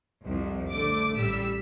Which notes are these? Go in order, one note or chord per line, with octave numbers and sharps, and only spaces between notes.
C2 F2
D3 A3 D6
A1 G3 E6 B6